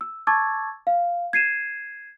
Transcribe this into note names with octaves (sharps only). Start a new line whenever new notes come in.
E6
A5 C#6 D6 E6 G#6 A6
F5
G#6 C7 D#7 E7